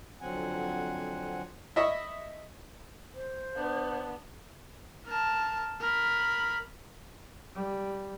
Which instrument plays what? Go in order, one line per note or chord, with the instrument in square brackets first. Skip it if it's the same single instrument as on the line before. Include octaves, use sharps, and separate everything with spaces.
[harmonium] F2 D3 F#3 C4 F#5 G#5
[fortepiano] E4 D#5 E5 C#6
[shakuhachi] C5
[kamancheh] B3 D4
[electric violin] A#4 A5
A#4 B5
[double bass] G3